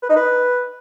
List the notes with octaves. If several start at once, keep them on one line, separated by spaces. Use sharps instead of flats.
B4
D#4
B4